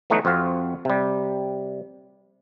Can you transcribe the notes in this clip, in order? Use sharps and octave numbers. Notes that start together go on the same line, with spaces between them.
E3 F#3 A3 B3 D#4 F#4
F2 C4 F#4 F5
C3 G3